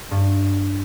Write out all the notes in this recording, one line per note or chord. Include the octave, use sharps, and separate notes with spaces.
G2